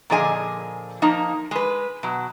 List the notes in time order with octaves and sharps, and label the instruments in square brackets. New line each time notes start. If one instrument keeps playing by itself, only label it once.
[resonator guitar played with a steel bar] A#2 D3 F3 G#4 D#5 G#5
F3 A#3 D#4
G#3 B4
B2 F#3